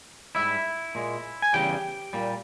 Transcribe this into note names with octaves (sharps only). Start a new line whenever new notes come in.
G#2 G3 E4 E5
A#2 G#3
G#5
E2 C#3 E3 G3 G4 G5
A#2 G3